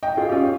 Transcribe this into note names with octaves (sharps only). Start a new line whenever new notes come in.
D#5 G5
F4 G#4
G4
C#4 F4